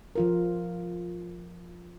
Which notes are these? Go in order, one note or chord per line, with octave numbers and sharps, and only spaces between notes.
F3 F4 A#4